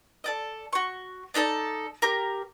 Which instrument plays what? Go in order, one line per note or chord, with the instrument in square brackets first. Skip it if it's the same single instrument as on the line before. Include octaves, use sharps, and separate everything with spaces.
[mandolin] A4 D5 D#5
F#4 C#6
D4 D#4 A4 D5
G4 A#4